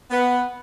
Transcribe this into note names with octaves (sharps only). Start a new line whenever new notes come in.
B3